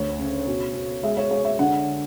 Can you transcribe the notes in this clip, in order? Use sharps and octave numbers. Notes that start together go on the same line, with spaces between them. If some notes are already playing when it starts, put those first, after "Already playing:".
Already playing: D2 C#5
C#3
B2
B2
G#3 E5
C#5
G#3 C#5
E5
D3 F#5